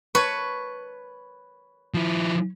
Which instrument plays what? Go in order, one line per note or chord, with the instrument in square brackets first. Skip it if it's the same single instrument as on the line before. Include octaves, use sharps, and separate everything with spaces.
[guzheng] B4 [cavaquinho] C#5 A5 C#6
[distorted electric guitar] F3 E4